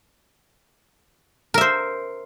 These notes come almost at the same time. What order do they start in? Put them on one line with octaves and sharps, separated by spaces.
A#4 E5 C5